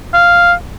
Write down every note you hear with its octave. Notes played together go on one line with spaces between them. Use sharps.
F5